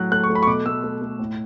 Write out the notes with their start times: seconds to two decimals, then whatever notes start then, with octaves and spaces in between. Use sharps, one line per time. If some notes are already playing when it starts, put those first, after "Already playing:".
Already playing: A2 F#3 F#6
0.12 A3 F#6
0.24 C#6
0.29 A3
0.35 B5
0.43 C#6
0.47 B2 D6
0.66 A3 E6
0.84 A3
1.02 A3
1.19 A2